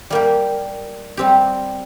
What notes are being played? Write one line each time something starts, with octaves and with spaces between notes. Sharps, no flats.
G3 A#3 G4
G3 C4 G4